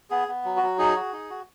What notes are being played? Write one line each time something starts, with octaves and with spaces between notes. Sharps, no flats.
B3 G#4
B3
F#3
F#4
F#3
D#4 G#4
F#4
D#4
F#4